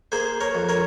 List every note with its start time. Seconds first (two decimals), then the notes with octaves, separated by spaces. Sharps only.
0.12 A#3 G#4 C5
0.41 A#4 C#5
0.55 F2
0.69 A#4 C#5